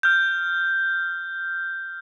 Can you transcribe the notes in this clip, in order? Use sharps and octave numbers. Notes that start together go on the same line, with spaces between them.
F6 G6